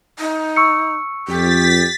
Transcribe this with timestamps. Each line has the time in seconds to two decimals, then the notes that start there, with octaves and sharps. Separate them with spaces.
0.19 D#4
0.56 C#6 E6 C#7
1.28 F2 G4 A6 B6